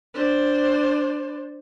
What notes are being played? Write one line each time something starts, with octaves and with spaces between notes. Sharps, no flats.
D4 C5